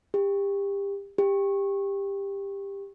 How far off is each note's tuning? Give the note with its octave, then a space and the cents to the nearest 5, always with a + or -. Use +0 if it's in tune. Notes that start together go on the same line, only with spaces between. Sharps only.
G4 +25
G4 +15